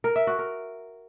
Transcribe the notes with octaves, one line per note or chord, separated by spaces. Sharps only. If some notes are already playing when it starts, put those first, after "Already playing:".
A#4
E5
F#4
A#4